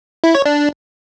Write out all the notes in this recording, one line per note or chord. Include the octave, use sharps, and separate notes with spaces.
E4
C#5
D4